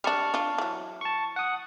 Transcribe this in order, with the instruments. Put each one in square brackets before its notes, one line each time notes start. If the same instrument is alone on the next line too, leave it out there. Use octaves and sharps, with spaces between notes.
[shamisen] G3 D4 [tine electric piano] A5 C#6 F6
[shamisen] D4 F4
E3 F#3
[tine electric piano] A5 C#6
F#5 D#6